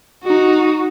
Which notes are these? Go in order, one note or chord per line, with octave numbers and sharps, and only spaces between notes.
D#4 F#4